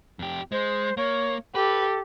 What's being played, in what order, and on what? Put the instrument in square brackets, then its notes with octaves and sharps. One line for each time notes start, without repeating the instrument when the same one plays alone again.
[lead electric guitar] F2 G4
[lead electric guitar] G#3 [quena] C5
[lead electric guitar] A#3 [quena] C#5
[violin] G4 [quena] A4 [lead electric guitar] B4